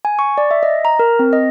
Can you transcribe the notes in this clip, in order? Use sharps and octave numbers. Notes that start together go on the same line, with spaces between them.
G#5
C#6
D5
E5
D#5
A#5
A#4
C4
D#5